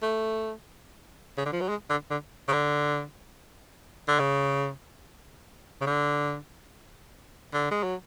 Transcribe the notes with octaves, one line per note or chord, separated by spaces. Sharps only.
A3
C#3
D3
F3
F#3
G#3
D3
D3
C#3
D3
D3
C#3
C#3
D3
D3
G#3
F#3